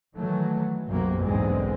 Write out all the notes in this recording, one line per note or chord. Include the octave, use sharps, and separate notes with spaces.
D#3 E3 F#3 A3
B1 F#2 C3 F#3 A#3
B1 E2 G#2 D3 G#3 C4